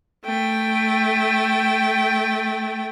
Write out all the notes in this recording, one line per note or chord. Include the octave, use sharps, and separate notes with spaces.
A3 G5